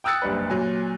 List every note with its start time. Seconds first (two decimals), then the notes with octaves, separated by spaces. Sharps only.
0.04 G5 D#6 E6 F#6 A6 C#7
0.22 F#1 C2 D4 B4
0.50 A#2 F#3 G#5